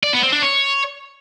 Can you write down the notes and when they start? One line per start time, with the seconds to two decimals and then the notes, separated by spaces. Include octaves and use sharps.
0.03 D5
0.13 B3
0.23 C4
0.32 D4
0.42 C#5